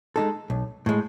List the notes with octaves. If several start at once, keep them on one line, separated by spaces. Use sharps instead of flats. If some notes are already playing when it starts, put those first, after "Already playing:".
G#3 D#4 A4
B1
A2 G#3